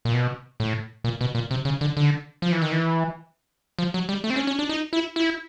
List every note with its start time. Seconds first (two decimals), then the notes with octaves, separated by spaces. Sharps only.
0.05 A#2
0.14 B2
0.60 A2
1.04 A#2
1.21 B2
1.35 A#2
1.51 C3
1.65 C#3
1.81 D3
1.97 D3
2.42 F3
2.52 E3
2.62 D#3
2.72 E3
3.79 F3
3.94 F#3
4.09 G3
4.24 A3
4.30 C4
4.36 C#4
4.47 C#4
4.59 D4
4.69 D#4
4.93 E4
5.16 E4